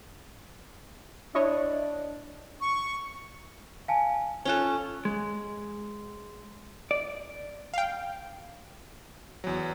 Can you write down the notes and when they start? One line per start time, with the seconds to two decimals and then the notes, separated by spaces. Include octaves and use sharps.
1.35 D4 E4 C#5 D#5
2.61 C#6
3.88 F5 G#5 A5
4.45 C#4 F4 A4 F#6 G7
5.05 G#3
6.91 D5
7.74 F5 G5
9.44 E2 F#3